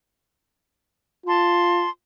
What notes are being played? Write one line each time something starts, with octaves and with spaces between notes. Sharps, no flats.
F4 A5 C6